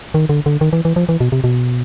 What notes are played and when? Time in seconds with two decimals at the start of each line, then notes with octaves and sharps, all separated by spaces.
0.14 D#3
0.29 D3
0.46 D3
0.61 D#3
0.73 E3
0.85 E3
0.96 F3
1.09 E3
1.21 B2
1.32 C3
1.44 B2